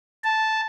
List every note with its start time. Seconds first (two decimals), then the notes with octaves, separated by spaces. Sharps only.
0.24 A5